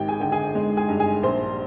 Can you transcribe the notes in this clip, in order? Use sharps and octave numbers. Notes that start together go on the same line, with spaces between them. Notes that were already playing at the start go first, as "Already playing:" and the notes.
Already playing: G#1 G4 G5
G#4 G#5
D3 G5
G#4 G#5
G#3
G#4 G#5
G2
G#4 G#5
A#1 C5